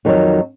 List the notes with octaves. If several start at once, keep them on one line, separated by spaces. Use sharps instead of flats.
F2 D#3 F#3